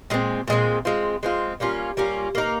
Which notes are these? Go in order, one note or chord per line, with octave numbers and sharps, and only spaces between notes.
A#2 G#3 C4
A#2 G#3 C4
G#3 C4 F4
G#3 C4 F4
G3 A#3 C#4 F4
G3 A#3 C#4 F4
A#3 D#4 A#4